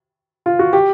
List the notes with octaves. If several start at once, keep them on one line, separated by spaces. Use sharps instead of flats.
F4
F#4
G4